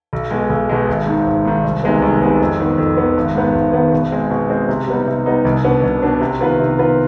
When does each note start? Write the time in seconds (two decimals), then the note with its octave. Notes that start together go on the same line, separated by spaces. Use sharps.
0.13 B1
0.31 B2 G#3
0.50 B1
0.69 B2 G#3
0.89 G#1
1.07 G#2 D#3
1.27 G#1
1.45 G#2 D#3
1.64 C2
1.83 C3 D#3 G#3 B3
2.02 C2
2.21 C3 D#3 G#3 B3
2.40 F2
2.60 D#3 B3
2.78 F2
2.97 D#3 B3
3.17 G#1
3.35 G#2 D#3 B3
3.54 G#1
3.73 G#2 D#3 B3
3.93 B2
4.12 G#3 C4
4.31 B2
4.49 G#3 C4
4.69 C3
4.88 G3 B3 D#4
5.07 C3
5.26 G3 B3 D#4
5.45 C2
5.64 B2 B3 D4
5.83 C2
6.02 B2 B3 D4
6.21 C3
6.40 D#3 B3 F4 B4
6.59 C3
6.78 D#3 B3 F4 B4